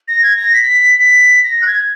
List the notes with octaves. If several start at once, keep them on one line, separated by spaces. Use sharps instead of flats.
A#6
G#6
A#6
B6
B6
A#6
F#6
G#6